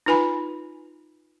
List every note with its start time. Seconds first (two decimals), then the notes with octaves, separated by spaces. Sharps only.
0.06 D#4 F4 B4 G#5 B5